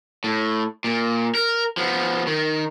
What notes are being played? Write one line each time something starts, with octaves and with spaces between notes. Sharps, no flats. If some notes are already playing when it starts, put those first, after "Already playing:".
A2
A#2
A#4
F3 B3
D#3